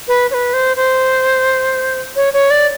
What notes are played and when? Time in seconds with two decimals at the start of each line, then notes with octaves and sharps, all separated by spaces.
0.08 B4
0.31 C#5
0.34 B4
0.54 C5
0.77 C5
2.16 C#5
2.33 C#5
2.51 D5